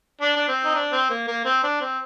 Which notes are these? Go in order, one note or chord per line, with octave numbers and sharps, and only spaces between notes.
D4
D4
C4
D#4
D4
C4
A#3
A#3
C4
D4
C4